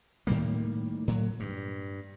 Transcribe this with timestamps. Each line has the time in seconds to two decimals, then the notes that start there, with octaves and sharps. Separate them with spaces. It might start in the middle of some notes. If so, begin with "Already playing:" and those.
0.27 A2 D#3 G3 A#3
1.08 A2 F#3
1.40 G2